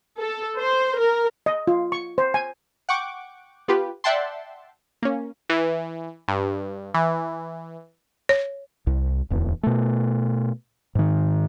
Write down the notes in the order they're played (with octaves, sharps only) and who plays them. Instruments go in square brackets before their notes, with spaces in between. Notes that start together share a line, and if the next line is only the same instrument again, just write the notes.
[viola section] A4
C5
A#4
[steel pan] D#5
F4
C#6
C5
G#5
[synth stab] F#5 G5 C#6 D6
B3 F4 G4 B4
D5 E5 F#5 G5 A5 C6
A#3 C#4
E3
G2
E3
[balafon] C#5
[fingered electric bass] C2
D1 E2
B2 A3
G#2 D#3